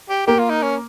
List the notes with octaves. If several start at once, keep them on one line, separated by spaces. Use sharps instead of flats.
G4
A#3 G4
F4
D#4
C#4